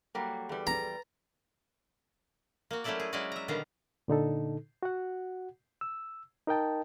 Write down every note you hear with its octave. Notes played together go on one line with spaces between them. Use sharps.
F#3 G3 A#3 A4 F#5
E2 G3 G#4 A4 B4
B4 A#5 A6
A#3 F#4
F#3 A3 C#4 E4 A4 D5
G#4
F#3 G#3 C#4 E4 F#4 D5
E5 A#5
B2 D3 D#3 G3 F5 A#5
A#2 D3 D#4 A4
F#4 F#5
E6
D#4 A#4 D#5 G5 A5